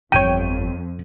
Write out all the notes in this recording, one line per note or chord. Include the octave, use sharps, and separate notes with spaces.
G1 F2 E3 C#5 G5 D#7